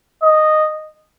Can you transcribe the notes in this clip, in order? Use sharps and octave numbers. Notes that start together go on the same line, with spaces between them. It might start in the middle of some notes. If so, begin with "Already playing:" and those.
D#5